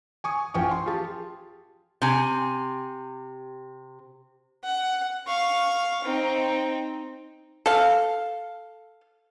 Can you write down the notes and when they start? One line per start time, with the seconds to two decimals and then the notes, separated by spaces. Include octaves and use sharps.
0.24 G#5 C#6 D#6
0.54 A1 F3 G5 G#5 C#6
0.71 C6
0.86 F4 G4 G#4 A5
2.02 C3 G#5
4.64 F#5
5.27 F5 C#6
6.04 C4 D#4
7.66 A4 F5